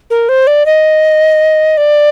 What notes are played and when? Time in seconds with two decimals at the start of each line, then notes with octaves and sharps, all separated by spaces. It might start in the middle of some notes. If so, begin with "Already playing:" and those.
0.10 A#4
0.29 C5
0.47 D5
0.66 D#5
1.77 D5